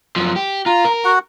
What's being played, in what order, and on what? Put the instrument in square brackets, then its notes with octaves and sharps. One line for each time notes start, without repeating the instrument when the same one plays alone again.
[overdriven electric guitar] F#2 F3
G4
[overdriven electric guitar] F4 [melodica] A#5
[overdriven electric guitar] A#4
[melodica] F#4 F#5